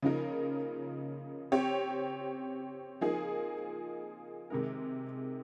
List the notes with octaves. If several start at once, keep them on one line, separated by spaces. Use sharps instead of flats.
C#3 F3 A#3 D#4 A#4
C4 G4 C#5
F3 A#3 D#4 G#4
C3 D#3 G#3 D#4 A#4